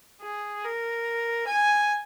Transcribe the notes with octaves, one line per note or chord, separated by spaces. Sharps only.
G#4
A#4
G#5